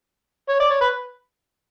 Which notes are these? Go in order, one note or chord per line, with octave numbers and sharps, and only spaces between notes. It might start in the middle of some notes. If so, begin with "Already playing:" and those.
C#5
D5
C#5
B4